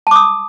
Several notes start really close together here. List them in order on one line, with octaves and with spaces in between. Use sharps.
A5 D6 D#6